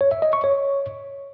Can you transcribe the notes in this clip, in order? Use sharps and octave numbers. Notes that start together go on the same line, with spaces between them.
C#5
E5
D#5
C#6
C#5